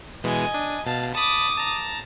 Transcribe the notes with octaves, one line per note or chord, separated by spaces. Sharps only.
B2 E3 G#3 D#5 G#5
D4
B2 F5 A5
A5 B5 D6 D#6
A5 A#5